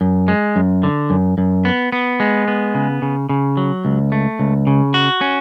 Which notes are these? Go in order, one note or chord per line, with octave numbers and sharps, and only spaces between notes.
F#2
G#3
F#2
D3
F#2
F#2
B3
B3
G#3
B3
C#3
C#3
C#3
F#3
C#2
A3
C#2
C#3
F#4
C#4